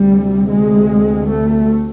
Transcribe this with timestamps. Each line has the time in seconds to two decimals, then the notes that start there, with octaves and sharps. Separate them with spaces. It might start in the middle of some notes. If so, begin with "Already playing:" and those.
Already playing: D2 C3 G3
0.50 G#3
1.30 A3